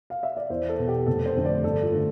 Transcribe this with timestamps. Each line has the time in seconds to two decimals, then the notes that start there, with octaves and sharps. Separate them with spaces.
0.10 F5
0.23 E5
0.37 D5
0.50 E2 C5
0.69 A4
0.78 B2 B3
0.88 G4
1.06 F1 A4
1.26 C5
1.35 F2 D3 A3
1.45 D5
1.64 G1 A4
1.83 F4
1.92 D3 A3